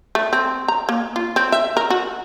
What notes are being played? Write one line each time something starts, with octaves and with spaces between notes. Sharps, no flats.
A3
C4
A#5
A#3
F4
C4
E5
A#4
F#4